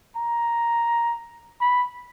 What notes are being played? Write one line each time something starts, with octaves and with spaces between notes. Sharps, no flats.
A#5
B5